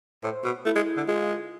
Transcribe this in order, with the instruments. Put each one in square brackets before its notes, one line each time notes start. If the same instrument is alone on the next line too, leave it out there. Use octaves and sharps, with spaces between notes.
[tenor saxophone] A2 [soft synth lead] C5
[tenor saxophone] B2
[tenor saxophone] A3 [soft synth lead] E4
[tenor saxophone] G#3
D3
[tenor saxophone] G#3 [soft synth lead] F4
[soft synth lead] F4